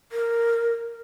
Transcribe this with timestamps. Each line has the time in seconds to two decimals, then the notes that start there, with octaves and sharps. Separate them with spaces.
0.12 A#4